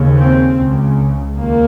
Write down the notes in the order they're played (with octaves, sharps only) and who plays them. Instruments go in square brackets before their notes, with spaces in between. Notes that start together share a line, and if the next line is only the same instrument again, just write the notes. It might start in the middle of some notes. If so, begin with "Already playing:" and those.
Already playing: [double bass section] D#2 C#3
C4
C#2 C#3
D#2 A#3